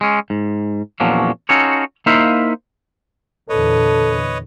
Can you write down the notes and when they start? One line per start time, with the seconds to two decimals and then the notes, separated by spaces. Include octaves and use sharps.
0.01 G#3 C#4
0.30 G#2
1.00 E2 A#2 F3 F#3 C#4 D4
1.49 C#4 D#4 F4 F#4 A4 C#5
2.06 A#3 D#4 E4 C5 E5 F5
3.49 E2 A#2 D3 A4 B4 C#5 D#5